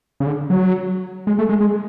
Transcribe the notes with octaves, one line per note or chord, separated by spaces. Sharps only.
C#3
D3
F#3
G#3
A3
G#3
G#3